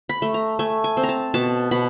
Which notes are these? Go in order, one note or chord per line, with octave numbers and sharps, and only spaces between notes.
B5
A3
A#5
A3 G#5
G#5
C4
A#5
A5
B2 A5
B2 B5